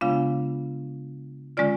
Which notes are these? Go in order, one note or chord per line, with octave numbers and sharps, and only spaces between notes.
C#3 G#3 B3 D4 F4 F5
D3 G#3 C#4 F4 D5